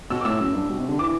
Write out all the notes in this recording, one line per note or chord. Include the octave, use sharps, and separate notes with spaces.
B2 E6
D6
A2 E6
F#2
G2
B2
C3
D3
E3 D6